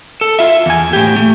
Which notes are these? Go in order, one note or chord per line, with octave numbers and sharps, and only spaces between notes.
A4
F4 E5
E2 G#5
A2 G4
A3